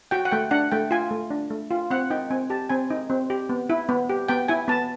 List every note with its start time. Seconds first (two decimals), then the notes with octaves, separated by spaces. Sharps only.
0.11 F#4 G5
0.25 F#5
0.31 A3 G5
0.51 D4 F#5
0.72 A3 G5
0.91 F4 G#5
1.11 A3
1.30 D4
1.50 A3
1.71 F4
1.91 C4 F#5
2.10 D#4 G5
2.31 C4 G#5
2.50 G4 A5
2.69 C4 G#5
2.90 D#4
3.10 C4
3.30 G4
3.49 B3
3.70 E4
3.89 B3
4.10 G4
4.28 B3 G5
4.48 E4 G#5
4.68 B3 A5